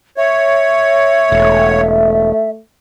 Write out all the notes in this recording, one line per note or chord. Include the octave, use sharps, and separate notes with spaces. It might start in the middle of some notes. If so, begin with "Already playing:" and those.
C#5 E5
E1 A3